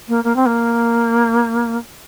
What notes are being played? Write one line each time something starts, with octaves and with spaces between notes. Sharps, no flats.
A#3
A#3
C4
A#3